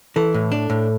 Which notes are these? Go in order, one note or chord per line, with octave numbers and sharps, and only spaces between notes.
E3 A4
A2
D4
A2